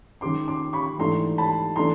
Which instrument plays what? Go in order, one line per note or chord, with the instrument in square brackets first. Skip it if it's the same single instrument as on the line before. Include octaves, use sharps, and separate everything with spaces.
[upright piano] D#3 G#3 C#4 C6 D6
C6 D6
B5 C#6
G#2 E3 A3 D4 A#5 C6
A5 B5
E3 A3 D4 A#5 C6